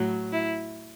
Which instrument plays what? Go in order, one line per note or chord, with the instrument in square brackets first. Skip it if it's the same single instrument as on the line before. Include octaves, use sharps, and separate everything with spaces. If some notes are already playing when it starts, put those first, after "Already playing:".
Already playing: [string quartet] A2 F#3
E4